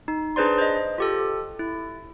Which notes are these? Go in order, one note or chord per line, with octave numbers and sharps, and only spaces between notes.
D#4
D4 G#4 B4 C5 D5 C6
C5 D#5
F4 G4 A4
E4